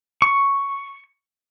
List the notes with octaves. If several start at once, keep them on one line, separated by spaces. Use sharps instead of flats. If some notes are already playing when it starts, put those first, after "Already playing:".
C#6